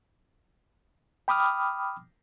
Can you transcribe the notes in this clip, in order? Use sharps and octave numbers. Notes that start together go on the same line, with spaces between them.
G5 B5 D6 D#6 F6